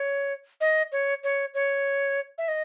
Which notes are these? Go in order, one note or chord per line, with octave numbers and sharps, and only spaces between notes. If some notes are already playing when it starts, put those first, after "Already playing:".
Already playing: C#5
D#5
C#5
C#5
C#5
E5
D#5